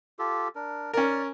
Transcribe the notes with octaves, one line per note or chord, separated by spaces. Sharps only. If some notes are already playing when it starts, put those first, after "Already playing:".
F4 G4 A4
D4 A#4
C#4 A#4 D5